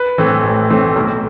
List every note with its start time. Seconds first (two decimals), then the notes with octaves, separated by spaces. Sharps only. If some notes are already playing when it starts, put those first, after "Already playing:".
Already playing: B4
0.18 A2 E3 A3 C4
0.43 A1
0.70 A2 E3 A3 C4
0.96 B1